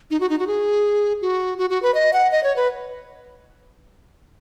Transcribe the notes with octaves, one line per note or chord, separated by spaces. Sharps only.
D#4
F#4
D#4
F#4
G#4
F#4
F#4
F#4
B4
D#5
F#5
D#5
C#5
B4